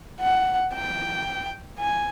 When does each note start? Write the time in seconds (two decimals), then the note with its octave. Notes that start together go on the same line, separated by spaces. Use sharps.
0.20 F#5
0.74 G5
1.79 G#5